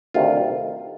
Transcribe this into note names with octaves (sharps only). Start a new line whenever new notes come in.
D2 C3 D#3 F4